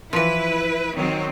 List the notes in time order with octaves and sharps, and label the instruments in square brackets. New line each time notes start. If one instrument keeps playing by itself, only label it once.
[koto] E3 F3 [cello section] E4 B4
[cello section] D#3 F#3 C4